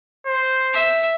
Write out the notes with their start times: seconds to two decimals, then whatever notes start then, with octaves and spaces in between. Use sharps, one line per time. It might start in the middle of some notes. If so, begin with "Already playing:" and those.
0.27 C5
0.73 E5